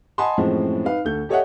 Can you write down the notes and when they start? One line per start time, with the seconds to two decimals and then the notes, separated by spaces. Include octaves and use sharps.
0.18 D#5 F#5 G#5 A5 B5 C6
0.38 F#2 A2 E3 F3 G#3 C4
0.85 D#4 B4 F5
1.05 D2 A4 G6
1.29 G4 A4 C#5 D#5 E5 F#5